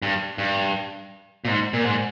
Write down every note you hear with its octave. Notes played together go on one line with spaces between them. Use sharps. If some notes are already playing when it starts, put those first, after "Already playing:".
G2
G2
A#2
G#2
A#2
G#2